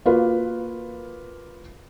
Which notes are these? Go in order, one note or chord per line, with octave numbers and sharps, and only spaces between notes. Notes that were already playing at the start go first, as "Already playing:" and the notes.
A#3 F4 F#4 B4